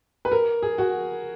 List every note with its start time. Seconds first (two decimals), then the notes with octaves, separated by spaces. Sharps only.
0.25 B4
0.32 A#4
0.62 G#4
0.78 F#4